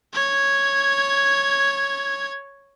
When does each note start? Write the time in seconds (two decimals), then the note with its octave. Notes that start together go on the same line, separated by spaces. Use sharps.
0.14 C#5 G#6